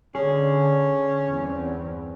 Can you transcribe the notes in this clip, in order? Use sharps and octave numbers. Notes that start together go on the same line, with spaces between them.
D3 C#4 G#4
E2 G2 C4